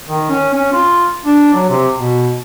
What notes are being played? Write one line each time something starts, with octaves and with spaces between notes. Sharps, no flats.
D#3
C#4
C#4
F4
D4
F#3
C3
B2